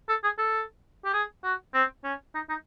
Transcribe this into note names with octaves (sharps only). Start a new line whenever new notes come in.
A4
G#4
A4
G4
G#4
F#4
C4
C#4
D#4
D#4